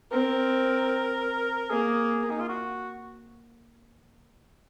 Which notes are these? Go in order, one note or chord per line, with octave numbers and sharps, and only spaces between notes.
C4 A#4
A#3 G#4
D#4
F4
F#4